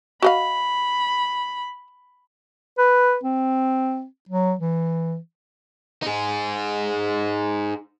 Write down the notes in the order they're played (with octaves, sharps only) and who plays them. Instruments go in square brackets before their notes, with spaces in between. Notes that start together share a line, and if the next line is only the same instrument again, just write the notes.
[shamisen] F#4 D#5 F5 [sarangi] B5
[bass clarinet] B4
C4
F#3
E3
[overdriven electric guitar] D#4 G#4